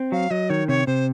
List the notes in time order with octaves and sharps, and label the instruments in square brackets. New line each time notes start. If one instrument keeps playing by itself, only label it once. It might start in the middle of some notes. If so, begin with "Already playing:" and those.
Already playing: [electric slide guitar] C4
[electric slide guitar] F#3 [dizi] F5
[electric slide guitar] F#3 [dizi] D#5
[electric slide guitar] D#3 [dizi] C#5
[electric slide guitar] C3 [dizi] C#5
[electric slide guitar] C3 [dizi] C5